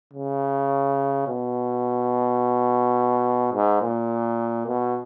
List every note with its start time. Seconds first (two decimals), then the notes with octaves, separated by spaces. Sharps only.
0.14 C#3
1.28 B2
3.54 G#2
3.82 A#2
4.67 B2